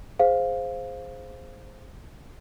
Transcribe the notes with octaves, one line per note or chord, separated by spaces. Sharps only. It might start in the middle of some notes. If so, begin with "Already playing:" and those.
G#4 C5 F5